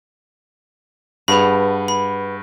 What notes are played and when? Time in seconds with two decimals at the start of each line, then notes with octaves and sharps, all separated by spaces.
1.28 G2 G#4 B4 F#5 A5 B5
1.88 B5